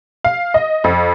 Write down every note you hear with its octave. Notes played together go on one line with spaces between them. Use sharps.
F5
D#5
F2